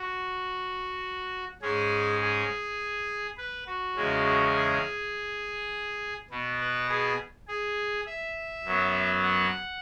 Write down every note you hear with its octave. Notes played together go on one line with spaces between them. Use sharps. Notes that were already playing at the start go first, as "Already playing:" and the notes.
Already playing: F#4
G#2 G#3 C#4 G#4
G#4
B4
F#4
E2 C#3 G#3 C#4
G#4
B2 B3
B4
G#4
G#4
E5
F#2 F#3 B3
F#5